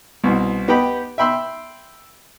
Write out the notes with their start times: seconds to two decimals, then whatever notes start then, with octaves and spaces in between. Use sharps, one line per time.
0.24 C2 B2
0.68 B3 G4 D#5 G5 B5
1.18 E5 G5 B5 C6 E6